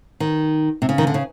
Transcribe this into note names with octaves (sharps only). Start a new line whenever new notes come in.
D#3
C3
C#3
D#3
D3
C#3